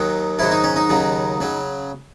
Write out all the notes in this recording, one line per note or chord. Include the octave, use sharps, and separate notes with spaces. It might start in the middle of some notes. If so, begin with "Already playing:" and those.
Already playing: D#2 D#3 F#3
G#2 D#3 F#3 E4
D#4
C#4
D#4
D#2 C#3 F#3
C#3 F#3